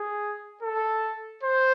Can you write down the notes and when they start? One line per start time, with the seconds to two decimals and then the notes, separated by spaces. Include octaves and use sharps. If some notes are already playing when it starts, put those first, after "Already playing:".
Already playing: G#4
0.62 A4
1.43 C5